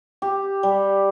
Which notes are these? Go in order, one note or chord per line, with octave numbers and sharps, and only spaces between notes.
G4
G3